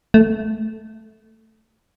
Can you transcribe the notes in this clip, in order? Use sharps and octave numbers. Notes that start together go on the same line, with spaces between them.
A3